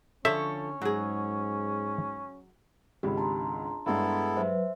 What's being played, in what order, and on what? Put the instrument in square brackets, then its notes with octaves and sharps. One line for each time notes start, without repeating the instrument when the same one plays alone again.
[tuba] D3 [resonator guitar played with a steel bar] F3 A4 C#5 [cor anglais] C#4 [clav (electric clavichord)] E5
[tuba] G#2 [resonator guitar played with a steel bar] F#3 G#4
[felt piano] G#1 C#2 [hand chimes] G4 B5
[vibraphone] D4 A#5 C6 [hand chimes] A5
[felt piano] G2 G#3 [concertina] B3 E4 A4
[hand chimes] G#4
[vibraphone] F#3 B4 [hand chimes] C5 E5